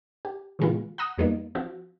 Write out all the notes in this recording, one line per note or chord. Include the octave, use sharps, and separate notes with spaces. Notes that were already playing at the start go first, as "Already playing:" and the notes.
G4
A#2 C#3 E3 G#3 B3 F4
F#5 A#5 D#6 F#6
F2 G3 A#3 B3 D#4
F3 C4 F#4